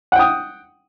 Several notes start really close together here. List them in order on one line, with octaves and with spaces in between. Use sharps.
F#5 G5 D#6